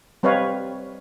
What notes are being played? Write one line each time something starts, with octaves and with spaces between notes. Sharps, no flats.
G3 C4 B4 C#5 D#5 F5